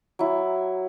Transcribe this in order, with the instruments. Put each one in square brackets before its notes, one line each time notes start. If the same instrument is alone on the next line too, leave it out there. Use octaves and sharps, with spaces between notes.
[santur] F#3 E4